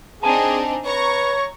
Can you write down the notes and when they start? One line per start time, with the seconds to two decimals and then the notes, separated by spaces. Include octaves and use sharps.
0.23 C4 D4 D#4 G#4 G#5 A5
0.86 B4 C#5 A#5 C#6